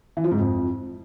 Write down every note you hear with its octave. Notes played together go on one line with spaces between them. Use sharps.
E3
F3
G#2
F2